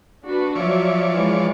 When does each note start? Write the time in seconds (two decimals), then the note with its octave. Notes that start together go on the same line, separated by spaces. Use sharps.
0.25 D4 F#4 B4
0.55 F3 F#3 C#5 D5 E5
1.15 E3 G#3